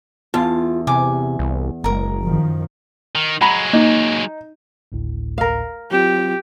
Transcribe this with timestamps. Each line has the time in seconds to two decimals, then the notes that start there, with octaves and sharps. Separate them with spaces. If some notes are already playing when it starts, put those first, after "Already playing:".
0.34 E2 F4 A5
0.87 C3 G#5 D6
1.39 C2
1.84 F#1 G#3 A#4 A#5
2.23 F#2 D#3 F3
3.15 D#3
3.41 F#3 G#3 F#5 A#5 B5
3.73 A#3 D#4
4.92 G#1 D2 A2
5.38 A#4 F5
5.91 F#3 C4 F4 G4